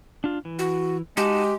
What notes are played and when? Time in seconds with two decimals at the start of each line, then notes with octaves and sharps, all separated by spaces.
0.24 D4 F4
0.45 E3
0.59 F#4
1.17 G#3 D#4 F#4 G4 A5